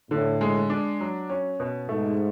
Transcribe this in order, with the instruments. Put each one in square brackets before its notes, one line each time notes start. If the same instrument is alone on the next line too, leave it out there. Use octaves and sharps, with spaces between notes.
[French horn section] A2 [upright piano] D3
[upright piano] G#3
D4
F#3
C#4
B2
[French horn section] G#2 [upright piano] A3